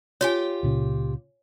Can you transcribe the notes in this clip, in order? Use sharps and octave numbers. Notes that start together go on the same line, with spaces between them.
F4 G4 C#5 G5 G#5
C#2 A#2 C#3